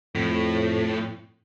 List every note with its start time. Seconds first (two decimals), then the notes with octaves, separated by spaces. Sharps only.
0.15 F2 A2